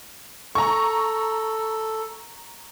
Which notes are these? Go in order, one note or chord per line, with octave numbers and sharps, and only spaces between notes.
A4 A#5 C#6